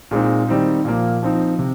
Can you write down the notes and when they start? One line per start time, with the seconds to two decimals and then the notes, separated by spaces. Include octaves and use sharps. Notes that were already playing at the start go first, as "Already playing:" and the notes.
0.11 A#2 G#3 C4 D#4
0.48 D#3 G3 C4 D#4
0.85 A#2 F3 A#3
1.23 F3 C4 D#4
1.59 C3